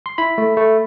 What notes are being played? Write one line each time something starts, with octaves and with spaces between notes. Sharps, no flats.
C6
E4 B5
A3
A3